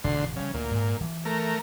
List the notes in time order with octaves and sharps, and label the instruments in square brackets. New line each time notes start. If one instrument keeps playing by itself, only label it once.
[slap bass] E1 A2 [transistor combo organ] D2 D3 C6
[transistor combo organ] C#3 [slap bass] F3 G3
[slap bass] D2 [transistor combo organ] A#2
[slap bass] G#2
E3 F3
[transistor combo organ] A3 A#4